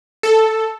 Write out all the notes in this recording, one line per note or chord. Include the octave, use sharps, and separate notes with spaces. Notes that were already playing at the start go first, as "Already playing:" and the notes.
A4